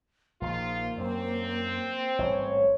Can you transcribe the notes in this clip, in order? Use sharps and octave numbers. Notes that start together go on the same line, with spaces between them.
A#1 D#3 F3 A#3 D#4 F4
F#2 F#3 C4
A1 G#2 G3 C#5